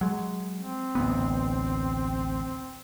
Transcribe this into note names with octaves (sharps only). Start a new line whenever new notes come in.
F#3 G#3
C4
A1 D2 B3